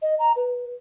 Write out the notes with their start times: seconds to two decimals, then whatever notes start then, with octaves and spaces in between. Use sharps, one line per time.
0.02 D#5
0.19 A#5
0.36 B4